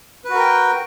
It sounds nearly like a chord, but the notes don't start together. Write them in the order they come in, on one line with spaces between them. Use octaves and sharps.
B4 F#4 A#4 G5